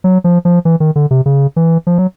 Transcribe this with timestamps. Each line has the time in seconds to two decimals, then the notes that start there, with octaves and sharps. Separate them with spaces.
0.04 F#3
0.24 F3
0.45 F3
0.65 E3
0.80 D#3
0.96 D3
1.11 C3
1.26 C#3
1.56 E3
1.87 F3
1.98 F#3